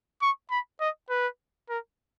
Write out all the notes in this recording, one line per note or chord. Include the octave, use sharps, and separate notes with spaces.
C#6
B5
D#5
B4
A#4